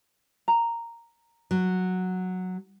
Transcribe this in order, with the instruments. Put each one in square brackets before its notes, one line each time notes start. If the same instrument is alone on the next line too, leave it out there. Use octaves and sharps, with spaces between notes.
[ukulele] A#5
[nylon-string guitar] F#3